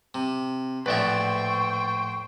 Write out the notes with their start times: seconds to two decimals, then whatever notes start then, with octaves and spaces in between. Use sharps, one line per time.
0.14 C3
0.86 A#1 A2 B4 C5 D5 E5 G5 C#6